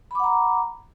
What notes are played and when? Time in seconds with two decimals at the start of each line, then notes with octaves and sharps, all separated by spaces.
0.11 B5
0.15 D6
0.19 F#5
0.24 A#5